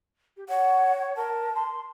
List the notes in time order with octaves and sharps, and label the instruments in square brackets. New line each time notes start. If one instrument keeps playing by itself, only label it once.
[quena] G4
[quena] C#5 [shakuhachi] F#5
[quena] A#4 [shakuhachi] A5
[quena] C6